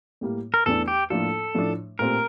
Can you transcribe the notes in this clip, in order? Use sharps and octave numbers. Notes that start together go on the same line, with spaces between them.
A2 G3 A#3
A#4
E2 E3 A3 D4 A4
G4
A2 F3 A#3 D4 F4 A4
A2 F3 A3 D4
A#2 A3 C4 G4 A#4